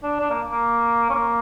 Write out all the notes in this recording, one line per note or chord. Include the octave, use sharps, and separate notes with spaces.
D4
D4
A#3
A#3
C#4
A#3